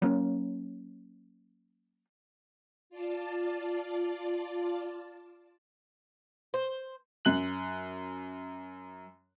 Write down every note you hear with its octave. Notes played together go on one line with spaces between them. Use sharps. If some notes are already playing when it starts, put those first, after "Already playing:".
F#3 A#3 B3 C#4
F4 D5 A5
C5
F#2 F#6 F#7